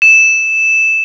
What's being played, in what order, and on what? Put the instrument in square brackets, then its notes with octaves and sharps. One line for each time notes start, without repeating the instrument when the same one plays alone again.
[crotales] E7